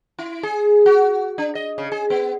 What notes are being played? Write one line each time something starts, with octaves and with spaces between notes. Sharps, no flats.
E4
G#4
F#4
D4
D#5
C#3
G#4
B3